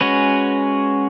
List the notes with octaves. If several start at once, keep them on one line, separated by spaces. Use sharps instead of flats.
G#3 C#4 F#4 B4